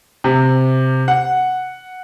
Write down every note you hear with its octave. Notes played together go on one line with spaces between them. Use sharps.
C3
F#5